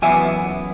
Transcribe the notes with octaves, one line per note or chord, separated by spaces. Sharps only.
F#2 E3 B3 E5 G#5